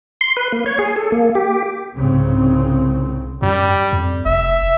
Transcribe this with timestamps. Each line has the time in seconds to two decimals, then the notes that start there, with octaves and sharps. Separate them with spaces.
0.21 C6
0.37 B4
0.52 A#3
0.66 C#5
0.79 G#4
0.96 A4
1.12 A#3
1.35 G4
1.96 C2 G#2 C#3 C4
3.42 F#2 G3
3.93 F2
4.26 F1 E5